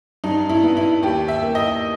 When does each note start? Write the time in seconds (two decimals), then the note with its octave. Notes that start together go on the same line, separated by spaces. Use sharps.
0.24 G2 D#4
0.49 E4
0.63 B3
0.77 E4
1.03 D#2 G4
1.28 E5
1.42 A#3
1.55 D#5